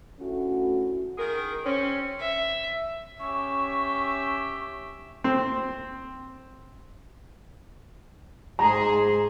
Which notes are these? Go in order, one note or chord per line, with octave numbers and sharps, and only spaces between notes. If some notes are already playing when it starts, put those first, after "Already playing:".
D2 A3 C#4 E4 F#4
D#3 G#4 A#4
C4 C#4
E5
C#4 G4 E5 C#6
C4
G#2 G#4 C5 A#5